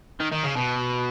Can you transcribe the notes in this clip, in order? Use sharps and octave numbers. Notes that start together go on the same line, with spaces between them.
D#3
D#3
C#3
B2